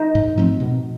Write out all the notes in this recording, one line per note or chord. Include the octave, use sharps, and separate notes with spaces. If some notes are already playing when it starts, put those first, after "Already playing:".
Already playing: D#4
G#2
F3 A3 C4
B2